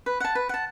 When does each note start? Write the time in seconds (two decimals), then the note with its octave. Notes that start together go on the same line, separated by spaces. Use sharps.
0.06 B4
0.20 F#5 A5
0.35 B4
0.49 F#5 A5